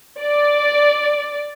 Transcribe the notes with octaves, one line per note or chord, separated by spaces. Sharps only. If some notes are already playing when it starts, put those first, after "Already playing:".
D5